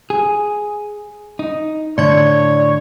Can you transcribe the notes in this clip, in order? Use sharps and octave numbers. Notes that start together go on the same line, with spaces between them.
G#4
D#4
A2 D3 C#5 D5 G#6